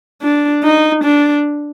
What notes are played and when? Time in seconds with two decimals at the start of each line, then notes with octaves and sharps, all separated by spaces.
0.22 D4
0.64 D#4
1.04 D4